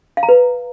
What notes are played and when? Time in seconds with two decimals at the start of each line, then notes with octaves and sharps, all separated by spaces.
0.17 F5
0.23 A#5
0.29 B4